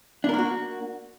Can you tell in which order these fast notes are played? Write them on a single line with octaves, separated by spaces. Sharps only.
D4 A#4 A#3 F#4